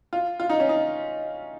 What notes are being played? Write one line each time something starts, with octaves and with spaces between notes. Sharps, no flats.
F4
F4
D#4
C#4
D#4